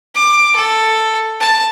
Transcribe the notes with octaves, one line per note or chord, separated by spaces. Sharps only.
D6
A4
A5